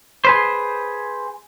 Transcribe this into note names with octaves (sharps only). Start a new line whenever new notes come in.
G#4 B4 C5